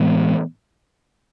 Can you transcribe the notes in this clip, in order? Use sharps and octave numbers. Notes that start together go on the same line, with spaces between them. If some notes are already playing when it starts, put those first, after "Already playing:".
Already playing: A2 E3 G#3 B3